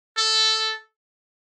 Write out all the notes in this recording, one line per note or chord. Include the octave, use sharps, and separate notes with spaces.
A4